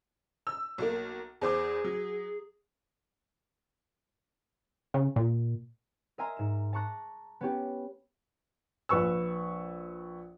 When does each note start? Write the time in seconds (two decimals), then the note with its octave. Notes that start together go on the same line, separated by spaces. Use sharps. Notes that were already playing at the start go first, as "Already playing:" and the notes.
0.47 E6
0.78 B1 A#3
1.41 E2 G#4 C5 D6
1.84 F#3
4.94 C#3
5.16 A#2
6.18 A#4 D#5 E5 G#5 A#5 C6
6.37 G#2 E7
6.73 A5 A#5 C#6 D6 F#6 A#6
7.41 B3 C#4 G4
8.89 A#1 B4 C#6 E6